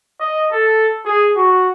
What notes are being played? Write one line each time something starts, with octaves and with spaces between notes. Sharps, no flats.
D#5
A4
G#4
F#4